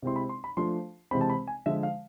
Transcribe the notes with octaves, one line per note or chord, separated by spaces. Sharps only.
C3 G#3 C4 E4 C6
B5
C6
B5
F3 A3 D4 F4 C6
C3 E3 G#3 C4 B5
A5
B5
G#5
D3 F3 G#3 E5
F5